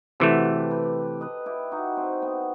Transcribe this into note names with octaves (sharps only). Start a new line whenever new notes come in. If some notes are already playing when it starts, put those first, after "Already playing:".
C3 E3 A3 F#4 A4
G4 B4
G4 B4
B4 D#5
E4 G4
D#4 F#4
C4
B3